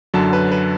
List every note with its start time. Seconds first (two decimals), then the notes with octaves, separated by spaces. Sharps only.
0.14 F#2 D3 F#3 A5
0.33 B4
0.52 B4